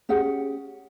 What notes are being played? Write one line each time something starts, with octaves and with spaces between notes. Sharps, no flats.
C#4 G4 G#4 F#5